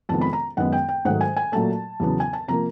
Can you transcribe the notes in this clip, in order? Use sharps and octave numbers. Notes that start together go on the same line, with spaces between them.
F2 C3 D#3 G#3 B3 A5
B5
A#5
F#2 D#3 G#3 B3 F#5
G5
G5
G#2 D#3 F#3 A3 F#5
G#5
G#5
A#2 F#3 A3 A5
E2 C#3 F#3 B3
G#5
A5
C3 F3 A#3 A#5